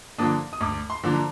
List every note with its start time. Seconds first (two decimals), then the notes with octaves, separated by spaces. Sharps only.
0.18 D3 F3 A#3 D4 D#6
0.53 D#6
0.61 D2 D6
0.90 C6
1.04 D3 F3 A#3 D4
1.14 A#5